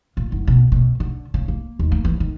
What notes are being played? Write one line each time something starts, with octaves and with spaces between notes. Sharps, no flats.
A#2
F#1
B2
B2
D3
C#3
A#3
D#2
A#3
E3
D#3